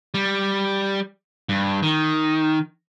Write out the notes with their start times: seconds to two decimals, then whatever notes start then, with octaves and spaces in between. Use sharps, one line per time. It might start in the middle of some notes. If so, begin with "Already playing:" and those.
0.14 G3
1.49 G2
1.83 D#3